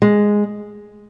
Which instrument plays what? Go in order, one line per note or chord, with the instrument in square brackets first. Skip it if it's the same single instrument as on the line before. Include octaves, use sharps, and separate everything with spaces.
[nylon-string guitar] G#3